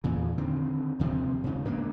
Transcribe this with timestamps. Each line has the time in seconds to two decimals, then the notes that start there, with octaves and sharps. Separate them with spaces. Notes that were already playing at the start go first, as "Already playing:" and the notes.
0.04 E2 A#2 C#3
0.38 D3 D#3 C4
0.99 D#2 C3 F3 C4
1.44 G#2 C#3
1.65 G#2 A#3 B3 D4